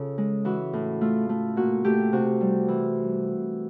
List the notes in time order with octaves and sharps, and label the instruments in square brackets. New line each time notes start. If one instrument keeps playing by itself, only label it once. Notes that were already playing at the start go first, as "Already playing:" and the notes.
Already playing: [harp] C#3 F4 A4
G#3
E3 F#4
A2
A3 F4
A3
A#2 F#4
A3 G4
C3 F#4
G3
E3